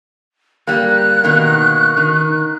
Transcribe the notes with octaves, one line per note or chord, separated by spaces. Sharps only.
G3 A#3 F#6
B2 D#3 A#3
D#3